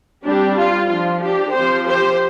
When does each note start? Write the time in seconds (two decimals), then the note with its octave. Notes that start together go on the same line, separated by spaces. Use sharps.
0.24 G3 C4 D4 G4
0.57 F4
0.90 F3 D4 F4
1.22 D4 G4
1.54 F3 C4 G4 C5
1.87 G4 C5